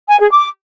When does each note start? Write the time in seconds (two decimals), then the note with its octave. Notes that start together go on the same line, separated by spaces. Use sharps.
0.08 G#5
0.19 G#4
0.30 D6